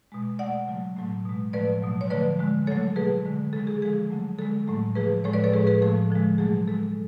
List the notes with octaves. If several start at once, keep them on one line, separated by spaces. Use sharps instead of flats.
B2 G#3
B2 A3 D5 F#5
C#3 F#3 A3
A2 F#3 A3
B2 G#3
A2 F3 A3 B4 D5
B2 F#3 A3
C#5
D3 F3 A3 B4 D5
D3 G#3
C#3 F#3 A3 A4 C#5
B2 F#3 A3 G#4 B4
D3 G#3
C#3 G#3 A4
G#4
D3 F3 G#3 G#4
C#3 F#3 A3
D3 G#3 A4
A2 F#3 A3
C#3 F3 A3 G#4 B4
A2 F3 G#3 A4 C#5
B4 D5
A4 C#5
A2 F3 G#3 G#4 B4
G#4 B4
A2 F3 A3 A4
D3 F3 G#3
B2 F#3 A3 G#4
B2 G#3 A4